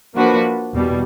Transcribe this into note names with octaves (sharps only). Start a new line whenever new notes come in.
F3 A#3 D4 F#4 B4
E2 B2 G3